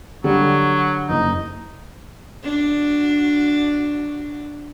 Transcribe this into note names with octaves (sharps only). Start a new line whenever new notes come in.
D3 F#3 G3
F#1 D#4
D4 F#4